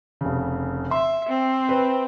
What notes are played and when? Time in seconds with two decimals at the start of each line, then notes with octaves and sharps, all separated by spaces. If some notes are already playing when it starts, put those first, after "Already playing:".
0.21 F1 C#3
0.91 E5 C6
1.29 C4
1.69 B4 C5